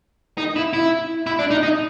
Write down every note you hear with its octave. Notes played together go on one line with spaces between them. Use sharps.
D#4
E4
E4
E4
D4
D#4
D#4